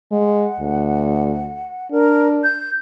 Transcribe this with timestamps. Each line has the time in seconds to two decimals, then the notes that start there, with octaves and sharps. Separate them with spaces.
0.12 G#3 F#5
0.60 D2
1.91 D4 A#4
2.44 G6